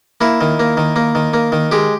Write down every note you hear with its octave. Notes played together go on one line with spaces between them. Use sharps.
A#3 E4
D#3
A#3
D#3
A#3
D#3
A#3
D#3
G#3 G4